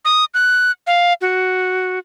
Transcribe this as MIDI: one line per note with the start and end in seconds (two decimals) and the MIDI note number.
0.05 0.25 87
0.34 0.71 90
0.87 1.13 77
1.21 1.99 66